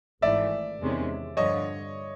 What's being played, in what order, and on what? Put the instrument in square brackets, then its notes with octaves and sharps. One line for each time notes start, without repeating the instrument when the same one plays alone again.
[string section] G#1 G#2 E3 A3 [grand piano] D5 E5
[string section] E2 C3 D#3 G#3 C#4
[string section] G2 D3 F3 [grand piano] C#5 D#5